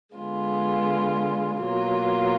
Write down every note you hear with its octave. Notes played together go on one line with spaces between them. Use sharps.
D3 G#3 B3 F4
B2 F#3 A#3 F4